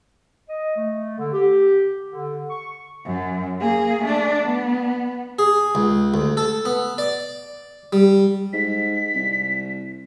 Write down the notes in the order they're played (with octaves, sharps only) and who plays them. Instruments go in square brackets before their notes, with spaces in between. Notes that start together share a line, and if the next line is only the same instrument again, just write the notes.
[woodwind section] D#5
A3
D3
G4
D3
C#6
[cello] F#2
A#3 G#4
A3 D4
B3
[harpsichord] G#4
C#2
D2
A4
B3
D5
G3
[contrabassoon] G#2 [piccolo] B6
[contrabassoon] C2